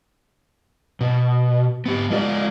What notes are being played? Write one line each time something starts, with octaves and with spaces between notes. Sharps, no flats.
B2
B3 G4
G#3 F4 D5